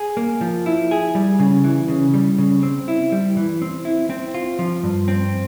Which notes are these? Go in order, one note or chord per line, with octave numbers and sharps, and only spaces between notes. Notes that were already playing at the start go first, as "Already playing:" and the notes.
Already playing: G#4
A#3
F3
E4
G#4
G3
C#3
E3
C#3
G3
C#3
C4
E4
G3
E3
C4
E4
C4
F4
F3
G2
C4